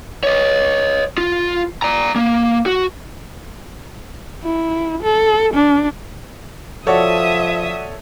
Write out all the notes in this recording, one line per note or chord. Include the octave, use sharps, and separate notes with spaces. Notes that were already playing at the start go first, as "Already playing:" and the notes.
C#5 D#5
F4
D5 A#5
A#3
F#4
E4
A4
D4
F3 F#4 A4 C#5 D5 E5 D#6